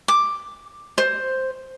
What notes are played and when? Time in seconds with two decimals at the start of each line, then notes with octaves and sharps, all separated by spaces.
0.08 D6
0.98 C5